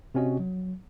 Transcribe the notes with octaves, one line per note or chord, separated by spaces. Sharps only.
C3 C4 C#4 F#4 D#5
F#3